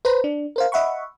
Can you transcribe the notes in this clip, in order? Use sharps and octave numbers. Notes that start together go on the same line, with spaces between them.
B4 C5 A#5
D4
A#4 C5 F5
D#5 E5 F#5 B5 C#6